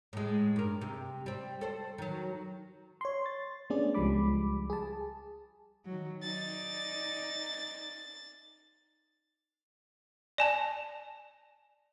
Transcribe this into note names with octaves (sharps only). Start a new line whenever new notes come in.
A2 G#3
G2 A#4
C3
G3 C4
A4 C5
D#3 F#3
C#5 C6
A6
A3 B3 C#4 D4 G#4 D5
C#2 F3 G3 G#3 B5 D6
G#4 A5
D#3 F#3
D#4 D5 A6
D5 G#5 A5